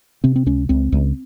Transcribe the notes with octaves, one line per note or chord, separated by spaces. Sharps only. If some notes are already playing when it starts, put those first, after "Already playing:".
C3 C4
C4
C#2 C#4
C#2 C4
C#2